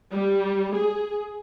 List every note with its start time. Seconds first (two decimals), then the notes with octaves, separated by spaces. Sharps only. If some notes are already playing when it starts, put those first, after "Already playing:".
0.12 G3
0.74 G#4